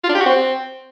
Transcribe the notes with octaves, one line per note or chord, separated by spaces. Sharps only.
F4
D4
G4
F#4
C4